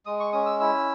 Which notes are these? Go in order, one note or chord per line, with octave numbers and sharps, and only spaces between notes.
G#3 D#6
C#6
C#4 D#6
E6
E4 E6